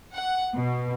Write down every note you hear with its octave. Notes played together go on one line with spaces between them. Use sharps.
F#5
B2